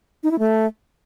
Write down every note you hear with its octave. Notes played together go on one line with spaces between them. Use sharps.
D#4
E4
A3